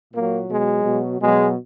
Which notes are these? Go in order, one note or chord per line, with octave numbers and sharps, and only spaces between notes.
A#2 F#3 A#3
B2 F#3 G#3
B2 F#3
B2 F#3 G#3